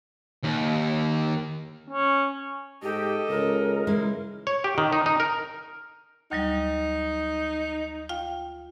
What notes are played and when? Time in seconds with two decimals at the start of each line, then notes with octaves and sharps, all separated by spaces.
0.44 D#2
1.90 C#4
2.83 G#2 G4 A4 D#5
3.29 C#2 A#4
3.87 E3 G#3 E4
4.47 C#5
4.64 G4
4.78 D#3
4.93 D#4
5.06 D#4
5.20 A#4
6.31 D2 F#3 G3 D#4
8.09 F4 F5 G5